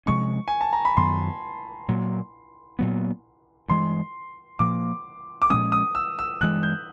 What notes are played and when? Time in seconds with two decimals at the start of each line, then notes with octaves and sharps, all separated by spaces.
0.06 C3 F3 G#3 C#4 C#6
0.48 G#5
0.61 A5
0.73 A#5
0.85 B5
0.97 F#2 D#3 F#3 B3 C6
1.88 A#2 F#3 A#3
2.79 A#2 F#3 B3
3.68 G2 E3 G#3 C6
4.59 A#2 F3 A#3 D6
5.42 D6
5.50 A#2 F3 G#3 C#4 D#6
5.72 D#6
5.95 E6
6.19 E6
6.41 G2 E3 G#3 F#6
6.63 G6